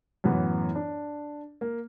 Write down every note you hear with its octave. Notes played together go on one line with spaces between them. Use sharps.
F#2 A2 E3 B3
D4
A#3